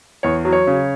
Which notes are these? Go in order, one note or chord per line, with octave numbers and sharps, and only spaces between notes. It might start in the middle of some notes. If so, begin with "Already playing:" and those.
E2 C#5
F#3
C#5
C#3